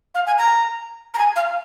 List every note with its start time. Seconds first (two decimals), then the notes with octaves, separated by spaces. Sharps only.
0.15 F5
0.27 G#5
0.38 A#5
1.14 A#5
1.18 G#5
1.36 F5